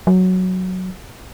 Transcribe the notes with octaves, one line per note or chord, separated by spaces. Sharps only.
F#3